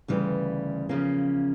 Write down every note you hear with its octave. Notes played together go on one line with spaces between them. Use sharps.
D2 C#3 E3 G3
E2 C#3 F3 A#3 C#4